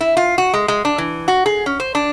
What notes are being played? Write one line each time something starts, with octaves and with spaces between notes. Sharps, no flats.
E4
F4
F#4
G#3
G#3
D4
E3
F#4
G#4
C#4
C5
D4